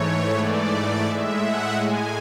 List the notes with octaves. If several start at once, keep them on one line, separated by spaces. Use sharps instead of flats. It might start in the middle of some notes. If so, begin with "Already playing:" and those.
Already playing: G#2 E3 A3 C#5
G#2 E3 A3 D5
A2 G#3 E5
F#5
A2 G#3 G#5